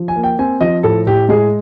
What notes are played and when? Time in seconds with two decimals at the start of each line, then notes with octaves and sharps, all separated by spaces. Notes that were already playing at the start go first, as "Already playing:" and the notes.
Already playing: F3
0.08 G#5
0.16 A#3
0.23 G5
0.39 C4 G#5
0.61 F3 D#5
0.83 A2 A4
1.07 A2 G4
1.29 G#3 G#4